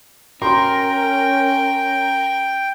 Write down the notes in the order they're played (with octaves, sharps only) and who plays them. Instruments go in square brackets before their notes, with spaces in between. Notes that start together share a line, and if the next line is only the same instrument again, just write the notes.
[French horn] C#4 [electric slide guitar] A#4 [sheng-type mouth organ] G5 [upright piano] C6